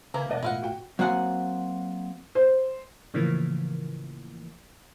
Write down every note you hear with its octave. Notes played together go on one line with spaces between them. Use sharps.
C#3 E3 A#3 B4 G#5 A#5
E1 D5 D#5 F#5 A5
A2 E4 F4 F5 F#5
F#4 G5
F#3 A#3 C4 F#5 G#5
C5
A2 C#3 E3 F3 A#3